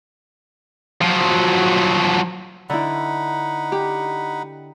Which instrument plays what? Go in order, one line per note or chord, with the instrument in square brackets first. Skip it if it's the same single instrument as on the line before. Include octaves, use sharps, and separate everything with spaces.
[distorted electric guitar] F3 F#3
[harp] D3 E4 [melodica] D#4 F#5 B5
[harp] G4